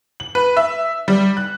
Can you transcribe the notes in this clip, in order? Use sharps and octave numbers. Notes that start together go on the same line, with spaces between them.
F#7
B4
E5
G3
F#6